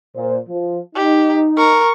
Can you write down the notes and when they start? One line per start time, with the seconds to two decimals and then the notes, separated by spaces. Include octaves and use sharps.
0.16 A#2 C5
0.49 F3
0.95 D#4 G4
1.57 A#4 C#6